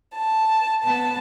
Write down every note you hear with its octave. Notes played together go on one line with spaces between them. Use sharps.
A5
B3 A5